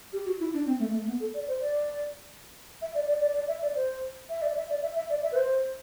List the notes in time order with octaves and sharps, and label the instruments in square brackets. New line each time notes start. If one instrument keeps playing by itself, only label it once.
[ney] G4
F#4
E4
D4
C4
A3
A3
B3
A4
D5
C5
D5
E5
D5
D5
D5
D5
E5
D5
C5
E5
D5
E5
D5
E5
E5
D5
E5
B4
C5